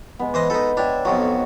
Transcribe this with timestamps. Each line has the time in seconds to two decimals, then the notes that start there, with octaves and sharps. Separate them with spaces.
0.19 G#3 B3
0.34 E3 C5 D#5
0.50 D#4 A4 B4 C5 D#5
0.77 D4 C#5 E5 G5
1.05 B1 F2 F#3 F#4